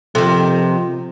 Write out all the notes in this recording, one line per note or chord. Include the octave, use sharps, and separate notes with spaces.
C3 D#3 F3 A4